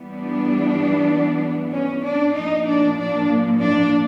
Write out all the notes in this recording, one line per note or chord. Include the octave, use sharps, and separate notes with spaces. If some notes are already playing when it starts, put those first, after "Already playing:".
Already playing: E3 G3 B3
D4
C#4
D4
A#2 F3 A#3 D#4
D4
D4
D4